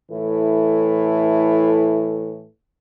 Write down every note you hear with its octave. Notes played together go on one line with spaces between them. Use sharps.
A2 E3 E4 A4